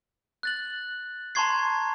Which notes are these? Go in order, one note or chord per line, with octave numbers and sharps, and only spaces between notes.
F#6 A6 F#7
A5 A#5 C6 C#6 G#6 C7